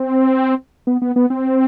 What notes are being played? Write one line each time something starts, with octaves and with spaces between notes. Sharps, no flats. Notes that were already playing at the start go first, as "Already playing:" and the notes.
Already playing: C4
B3
B3
B3
C4